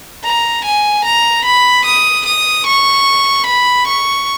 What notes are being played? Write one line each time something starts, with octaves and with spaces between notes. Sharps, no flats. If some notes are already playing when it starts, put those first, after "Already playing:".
A#5
G#5
A#5
B5
D#6
D#6
C#6
B5
C#6